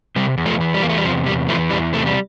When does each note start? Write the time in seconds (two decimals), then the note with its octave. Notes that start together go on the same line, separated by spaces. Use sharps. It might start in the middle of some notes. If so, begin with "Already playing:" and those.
0.16 C3 G3
0.38 E2
0.46 F3 A3
0.61 E3
0.74 G3
0.82 E2 A#3
0.89 A3
0.98 G3
1.05 C3 F3
1.26 E2 G3
1.48 E3 F3 A3
1.71 E2 G3
1.93 C3 A3
2.06 G3